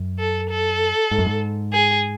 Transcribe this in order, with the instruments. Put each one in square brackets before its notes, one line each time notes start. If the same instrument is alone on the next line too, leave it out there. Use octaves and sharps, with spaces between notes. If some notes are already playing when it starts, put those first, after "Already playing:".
Already playing: [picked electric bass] F#2
[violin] A4
A4
[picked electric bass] G#2
F#2
G#2
[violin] G#4